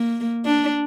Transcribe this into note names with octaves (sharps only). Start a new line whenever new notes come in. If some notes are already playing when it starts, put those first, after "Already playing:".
Already playing: A#3
D4